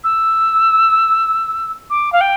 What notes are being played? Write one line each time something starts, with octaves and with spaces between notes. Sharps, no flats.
E6
D6
F5
G5